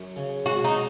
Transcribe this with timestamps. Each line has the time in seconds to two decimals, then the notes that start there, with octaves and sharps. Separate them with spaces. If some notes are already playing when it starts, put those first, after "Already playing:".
Already playing: F#2
0.16 C#3
0.45 G#3 F#4
0.64 D#4